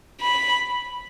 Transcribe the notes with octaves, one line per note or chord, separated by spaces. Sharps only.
B5